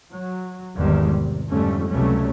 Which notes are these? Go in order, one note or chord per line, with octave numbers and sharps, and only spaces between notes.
F#3
G#1 E2 D3 D#3 G3 G#3
C3
F2 G#2 D3 G3 A3 C#4
C#2 C3 F#3 G3 A3 C#4